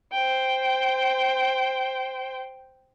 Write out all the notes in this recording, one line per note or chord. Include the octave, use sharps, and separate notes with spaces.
C5 G5